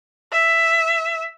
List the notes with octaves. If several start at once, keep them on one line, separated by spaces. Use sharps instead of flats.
E5